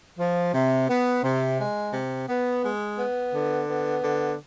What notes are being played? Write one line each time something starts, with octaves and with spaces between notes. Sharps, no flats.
F3
C3
B3
C3
G#3
C3
B3
G#3
B3
D3
B3
D3